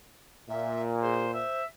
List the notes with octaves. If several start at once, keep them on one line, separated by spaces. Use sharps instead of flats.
A#2 E5
G#4 C5
C5 E5